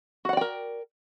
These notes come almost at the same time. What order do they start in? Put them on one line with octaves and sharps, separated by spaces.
F#4 F#5 D5 G5 A#4